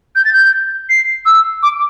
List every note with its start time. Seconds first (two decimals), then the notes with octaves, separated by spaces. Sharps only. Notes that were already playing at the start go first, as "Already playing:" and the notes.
0.15 G6
0.25 A6
0.33 G6
0.89 C7
1.26 E6
1.63 D6